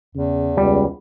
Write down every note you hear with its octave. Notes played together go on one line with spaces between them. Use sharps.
E2 C#3
C#2 G3